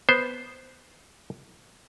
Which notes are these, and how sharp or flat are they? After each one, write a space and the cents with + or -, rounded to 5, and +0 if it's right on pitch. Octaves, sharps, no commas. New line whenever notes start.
B3 +0 C5 +0